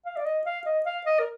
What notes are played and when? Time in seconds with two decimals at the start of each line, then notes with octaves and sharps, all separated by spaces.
0.06 F5
0.17 D5
0.26 D#5
0.46 F5
0.66 D#5
0.86 F5
1.06 D#5
1.20 A#4